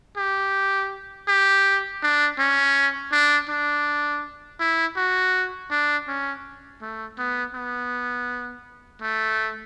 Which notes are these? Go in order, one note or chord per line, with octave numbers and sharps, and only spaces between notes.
G4
G4
D4
C#4
D4
D4
E4
F#4
D4
C#4
A3
B3
B3
A3